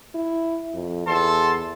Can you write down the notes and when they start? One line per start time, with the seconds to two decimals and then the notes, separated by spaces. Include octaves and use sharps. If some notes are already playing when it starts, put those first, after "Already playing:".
0.15 E4
0.74 F2
1.07 E2 A4 A5 C6